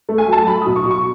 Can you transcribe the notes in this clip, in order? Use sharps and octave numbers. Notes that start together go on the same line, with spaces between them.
A3
G#5
F#3 A5
F#3 B5
D#6
B2
C#6
B2
C#6